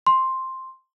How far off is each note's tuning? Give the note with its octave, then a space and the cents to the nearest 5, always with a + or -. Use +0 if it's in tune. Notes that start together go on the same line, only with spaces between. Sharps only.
C6 +5